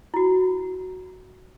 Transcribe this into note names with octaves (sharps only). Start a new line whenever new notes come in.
E4 F#4